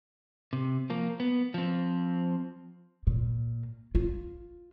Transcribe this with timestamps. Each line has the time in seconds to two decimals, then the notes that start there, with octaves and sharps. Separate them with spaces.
0.53 C3
0.90 F3 A#3
1.20 B3
1.54 F3 C4
3.07 A#2
3.95 F4